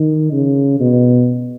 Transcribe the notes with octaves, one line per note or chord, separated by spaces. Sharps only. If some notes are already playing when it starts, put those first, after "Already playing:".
Already playing: D#3
C#3
B2